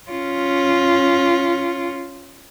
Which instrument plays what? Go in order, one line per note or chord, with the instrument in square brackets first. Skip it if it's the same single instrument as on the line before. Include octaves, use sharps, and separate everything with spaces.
[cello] C#4 F4